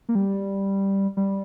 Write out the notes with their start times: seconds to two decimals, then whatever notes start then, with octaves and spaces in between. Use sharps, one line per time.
0.09 A#3
0.15 G3
1.17 G3